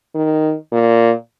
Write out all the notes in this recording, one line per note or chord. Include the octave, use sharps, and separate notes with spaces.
D#3
A#2